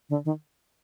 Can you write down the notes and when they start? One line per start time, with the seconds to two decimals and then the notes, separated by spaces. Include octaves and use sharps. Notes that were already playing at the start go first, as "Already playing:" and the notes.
0.10 D3
0.25 D#3